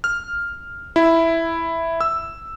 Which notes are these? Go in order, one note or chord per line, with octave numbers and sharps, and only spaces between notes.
F6
E4
E6